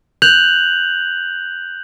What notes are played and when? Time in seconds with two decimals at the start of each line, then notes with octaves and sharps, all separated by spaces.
0.22 F#6 G6 F7 F#7